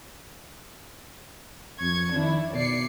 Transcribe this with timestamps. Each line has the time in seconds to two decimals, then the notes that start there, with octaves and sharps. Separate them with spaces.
1.81 F2 C#6 G#6
2.15 D#3 D4 E4
2.54 B2 D5 C7 C#7